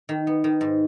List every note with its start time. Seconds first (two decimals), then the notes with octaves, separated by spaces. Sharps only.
0.09 D#3
0.27 B3
0.44 D#3
0.61 G#2